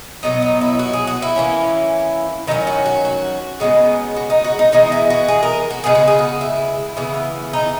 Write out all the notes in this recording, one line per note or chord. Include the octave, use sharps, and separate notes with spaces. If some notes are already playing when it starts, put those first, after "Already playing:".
B2 F#3 B3 D#4
D#4
E4
F#4
G#4
F#4
E4
E3 A#3 C#4
D#3 F#3 C#4 D#4
F#4
F#4
F#4
C#3 G#3 B3 D#4
F#4
D#4
F#4
D#4
E3 G#3 B3 D#4
E4
F#4
G#4
A#4
F#4
C#3 G#3 B3 G#4
F#4
G#4
F#4
E4
C#3 E3 B3
D#4